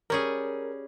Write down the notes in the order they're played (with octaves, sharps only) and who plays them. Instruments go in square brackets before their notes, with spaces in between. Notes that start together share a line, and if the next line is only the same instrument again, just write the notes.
[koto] G3 C#4 G#4 [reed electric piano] A#4